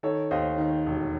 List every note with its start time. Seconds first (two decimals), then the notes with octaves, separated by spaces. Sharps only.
0.03 D#3 A4 C#5
0.31 D#2 C5 D#5
0.58 D#3
0.86 E1